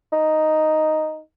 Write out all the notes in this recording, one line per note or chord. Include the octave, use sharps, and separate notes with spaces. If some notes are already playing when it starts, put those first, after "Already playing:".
D#4